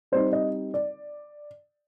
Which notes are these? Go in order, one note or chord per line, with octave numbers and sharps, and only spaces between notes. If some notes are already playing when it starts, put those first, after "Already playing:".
G3 C4 D#4 C5
D#5
D5